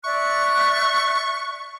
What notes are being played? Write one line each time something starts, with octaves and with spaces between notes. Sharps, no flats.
D5 E5 C#6 F#6